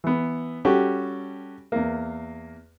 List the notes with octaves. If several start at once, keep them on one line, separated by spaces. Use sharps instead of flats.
E3 B3
G3 C#4 F#4 G4 A4
E2 A#3